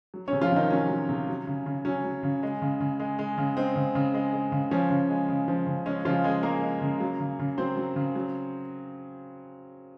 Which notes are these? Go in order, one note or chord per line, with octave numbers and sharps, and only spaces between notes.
F#3
C3 C#4 C#5
F3 F4
C3 D#3 D#4
F#3 C#4
F#3
C3
F#3
C#3
C#3
F#3 C#4
F#3
C#3
G#3
C#3
C#3
G#3
G#3
C#3
G#3 C4
C#3
C#3
G#3
G#3
C#3
F3 C#4
C#3
G#3
C#3
F3
C#3
G#3 C#4
C#3 F3 F4
C#3 G#3 G#4
G#3 A#3 A#4
G#3
C#3
F#3
C#3
C#3
F#3 C4 C5
F#3
C#3
F#3